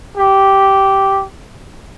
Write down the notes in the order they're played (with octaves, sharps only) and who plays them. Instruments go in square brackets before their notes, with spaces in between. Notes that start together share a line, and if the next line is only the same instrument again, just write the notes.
[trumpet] G4